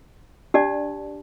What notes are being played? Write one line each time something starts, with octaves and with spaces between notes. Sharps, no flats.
D4 G4 D5 A5